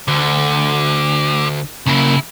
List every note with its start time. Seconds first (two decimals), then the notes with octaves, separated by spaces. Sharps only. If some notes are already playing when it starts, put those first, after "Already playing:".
0.08 D2 D3
1.86 D#2 C#3 A#3 E4